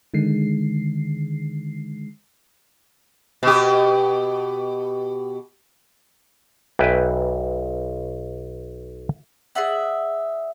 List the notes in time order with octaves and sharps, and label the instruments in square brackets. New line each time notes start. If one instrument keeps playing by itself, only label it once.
[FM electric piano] D3 D#3 G#3 C7
[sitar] B2 G4
[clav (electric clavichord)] B1 B4 E5 G5 G#5
[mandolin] G#4 D5 E5 F#5